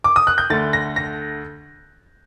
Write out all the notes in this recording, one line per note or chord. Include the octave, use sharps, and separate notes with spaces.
D6
D#6
F#6
G6
D2 D3 A3 A6
A#6
A#6